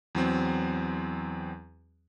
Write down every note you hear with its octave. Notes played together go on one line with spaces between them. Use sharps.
E2 F#3 C4